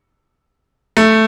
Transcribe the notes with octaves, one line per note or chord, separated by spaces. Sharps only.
A3